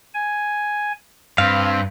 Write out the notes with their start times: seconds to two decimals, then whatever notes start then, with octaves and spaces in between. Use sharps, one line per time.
0.14 G#5
1.38 G2 C4 F5